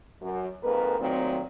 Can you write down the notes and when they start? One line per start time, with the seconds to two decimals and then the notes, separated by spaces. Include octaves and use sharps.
0.21 F#2
0.63 F2 G#2 A#3 A#4 B4
0.99 A#2 D#3 F#3 A3 C4